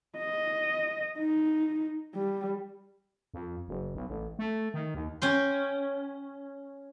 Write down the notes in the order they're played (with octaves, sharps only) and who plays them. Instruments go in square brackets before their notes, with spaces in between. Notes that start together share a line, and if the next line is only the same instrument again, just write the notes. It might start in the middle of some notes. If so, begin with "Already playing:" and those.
[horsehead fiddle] D#5
D#4
G3
[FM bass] F2
F#1
B1
A1
A3
D#3
D#2
[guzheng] C#4 G5 C6